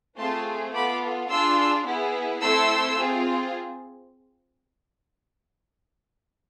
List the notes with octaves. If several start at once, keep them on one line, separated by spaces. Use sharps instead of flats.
A3 C4 F4 G#4 A5 C6
B3 F4 A4 B5 D6
D4 F4 G#4 C6 E6
B3 E4 G#4
A3 C4 E4 A4 C6 E6
C4 F4 G#4